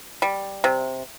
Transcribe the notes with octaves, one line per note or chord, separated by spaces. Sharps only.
G3
C3